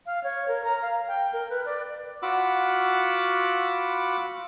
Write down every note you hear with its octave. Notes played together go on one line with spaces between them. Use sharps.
F5
C#5
A#4
A#5
F5
G5
A#4
B4
D5
F4 F#4 F#5 B5 D6 E6